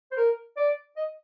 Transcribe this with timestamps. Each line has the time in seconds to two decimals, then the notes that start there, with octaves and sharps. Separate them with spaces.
0.11 C5
0.17 A#4
0.57 D5
0.97 D#5